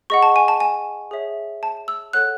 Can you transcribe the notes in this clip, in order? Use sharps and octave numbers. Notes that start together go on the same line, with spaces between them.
G#4 D#5 F#5 C#6
A5
G#5
A5
G#5
G#4 C#5 E5
A5
E6
A4 C#5 F#5 F#6